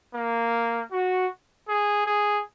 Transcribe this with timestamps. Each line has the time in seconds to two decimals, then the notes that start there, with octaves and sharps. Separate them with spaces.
0.14 A#3
0.91 F#4
1.68 G#4
2.06 G#4